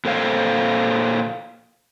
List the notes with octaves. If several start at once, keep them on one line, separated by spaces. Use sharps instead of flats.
A#2 A4 C5 F5